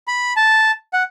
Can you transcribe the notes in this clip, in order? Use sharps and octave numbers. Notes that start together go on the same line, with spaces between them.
B5
A5
F#5